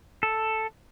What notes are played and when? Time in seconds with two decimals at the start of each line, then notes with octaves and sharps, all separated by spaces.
0.23 A4